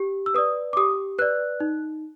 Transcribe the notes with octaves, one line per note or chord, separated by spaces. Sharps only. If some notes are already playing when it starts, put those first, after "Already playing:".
Already playing: G4
E6
B4 D5 D#6
D6
G4 D#6
B4 D5 F#6
D#4